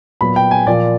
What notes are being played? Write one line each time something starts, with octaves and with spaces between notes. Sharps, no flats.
A#2 F#3 B3 B5
G5
G#5
A#2 F3 A#3 D5